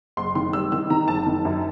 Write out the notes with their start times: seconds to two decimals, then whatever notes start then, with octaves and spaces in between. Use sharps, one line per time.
0.17 F#1 C6
0.35 D#3 C6
0.53 G3 E6
0.72 D#3 E6
0.90 D#3 A#5
1.08 F#1 A5
1.27 D#3
1.45 F#2